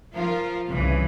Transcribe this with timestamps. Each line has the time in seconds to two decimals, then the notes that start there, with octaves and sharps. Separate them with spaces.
0.13 F3 F4 A#4
0.68 C2 G2 C#3 E3